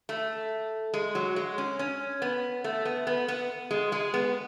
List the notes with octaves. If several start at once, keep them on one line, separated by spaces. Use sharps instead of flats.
A3
G#3
F#3
G#3
C#4
C#4
B3
A3
B3
B3
B3
G#3
G#3
B3